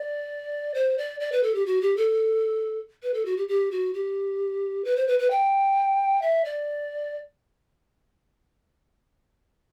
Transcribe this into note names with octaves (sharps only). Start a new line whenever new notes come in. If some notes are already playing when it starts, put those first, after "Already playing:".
Already playing: D5
C5
D5
D5
B4
A4
G4
F#4
G4
A4
B4
A4
F#4
G4
G4
F#4
G4
B4
C5
B4
B4
G5
E5
D5